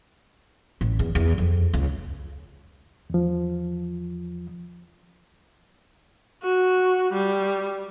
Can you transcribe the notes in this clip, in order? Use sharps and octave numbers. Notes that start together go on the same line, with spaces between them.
A1
E2
E2
F2
C#2
E2 F3
F#4
G3